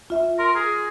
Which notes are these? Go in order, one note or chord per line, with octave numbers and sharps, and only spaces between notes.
F4 E5
A#4 C6
G#4